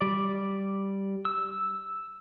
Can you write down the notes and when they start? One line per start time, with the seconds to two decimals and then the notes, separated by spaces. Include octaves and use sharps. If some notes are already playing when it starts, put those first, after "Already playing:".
0.01 G3 D5
1.25 E6